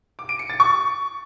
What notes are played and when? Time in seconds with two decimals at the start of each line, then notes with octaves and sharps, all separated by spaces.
0.19 D6
0.29 D7
0.39 C#7
0.49 A6
0.60 C#6